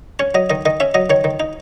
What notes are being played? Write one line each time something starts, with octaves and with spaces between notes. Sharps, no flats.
C#4 C#5
F#3 D#5
D#3 D#5
D#3 D#5
C#4 E5
F#3 D#5
D#3 C#5
D#3
D#4